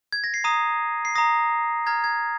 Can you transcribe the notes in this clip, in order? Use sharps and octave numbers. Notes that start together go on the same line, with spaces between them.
G#6
A#6
C7
A#5 D#6 D#7
C7
A#5 D#6 A#6
A#5 F6 G#6
G#6